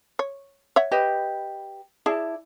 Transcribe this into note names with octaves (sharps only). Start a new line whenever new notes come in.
C#5
C#5 E5 F#5
G4 B4 D#5
E4 G#4 D5 A5